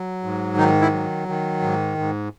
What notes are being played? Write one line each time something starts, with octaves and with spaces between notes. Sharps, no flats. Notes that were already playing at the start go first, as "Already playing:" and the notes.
Already playing: F#3
G#2
D#3 D#4
E4
F#3
D#3
G#2
G#2